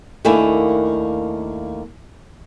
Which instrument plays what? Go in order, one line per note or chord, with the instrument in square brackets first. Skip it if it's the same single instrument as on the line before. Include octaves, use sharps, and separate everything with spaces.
[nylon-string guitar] D#2 A3 A#3 D4 E4 G#5